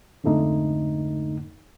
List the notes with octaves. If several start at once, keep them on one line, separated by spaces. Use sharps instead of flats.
F2 G#2 D3 A3 D#4